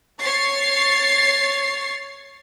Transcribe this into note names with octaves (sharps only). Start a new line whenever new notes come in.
C#5 A6 C7